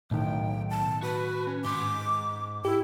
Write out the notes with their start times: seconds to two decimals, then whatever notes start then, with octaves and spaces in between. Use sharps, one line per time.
0.11 B1 A2 D#3 G5
0.70 A5
1.03 F#4 B4
1.47 C#4
1.65 G#2 C6 D6
2.65 E4 G4